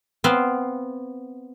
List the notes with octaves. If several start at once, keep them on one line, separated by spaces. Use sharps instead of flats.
B3 C4 F5